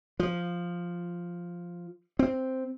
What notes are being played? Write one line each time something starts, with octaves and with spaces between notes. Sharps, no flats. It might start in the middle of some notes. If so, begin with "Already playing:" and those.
F3
C4